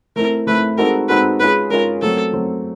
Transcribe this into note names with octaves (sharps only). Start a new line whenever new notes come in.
A3 C4 E4 A#4
A3 C4 E4 B4
G#3 C4 D#4 F#4 A4 A#4
G#3 C4 D#4 F#4 A4 B4
G#3 C#4 F4 G#4 B4
G#3 C#4 F4 G#4 A#4
F#3 A3 C4 A4
F#3 A3 C4